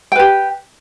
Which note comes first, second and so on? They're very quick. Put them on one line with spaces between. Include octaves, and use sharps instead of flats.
G5 B4 G4